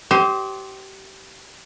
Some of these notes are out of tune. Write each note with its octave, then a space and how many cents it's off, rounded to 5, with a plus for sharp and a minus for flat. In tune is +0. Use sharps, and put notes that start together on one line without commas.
G4 -25 C5 +10 D#5 +30